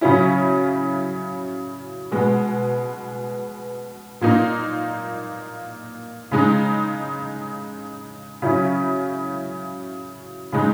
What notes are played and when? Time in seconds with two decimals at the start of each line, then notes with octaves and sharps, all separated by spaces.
0.01 C#3 F#3 C#4 E4
2.12 B2 G#3 B3
4.21 A#2 A#3 D#4
6.31 C#3 G#3 D#4
8.42 C#3 F#3 C#4 E4
10.52 C#3 G#3 D#4